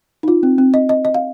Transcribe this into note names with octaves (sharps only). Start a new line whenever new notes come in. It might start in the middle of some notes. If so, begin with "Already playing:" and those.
D#4
F4
C4
C4
D#5
D#5
D#5
F5